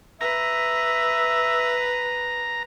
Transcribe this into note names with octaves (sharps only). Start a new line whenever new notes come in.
B4 E5 A#5